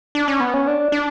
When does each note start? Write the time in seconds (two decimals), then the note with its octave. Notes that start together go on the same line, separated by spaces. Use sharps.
0.15 D4
0.28 C#4
0.40 B3
0.54 C#4
0.67 D4
0.92 D4